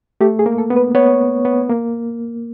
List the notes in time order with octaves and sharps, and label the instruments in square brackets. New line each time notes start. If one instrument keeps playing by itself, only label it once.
[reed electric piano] A3 [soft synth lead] G4
[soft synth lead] G#4
[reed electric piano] A#3
[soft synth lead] A4
[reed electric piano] B3
[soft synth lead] B4
[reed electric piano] B3 [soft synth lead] C#5
[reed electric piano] B3
A#3